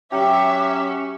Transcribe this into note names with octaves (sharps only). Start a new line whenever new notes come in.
F#3 C#4 G4 E5 D6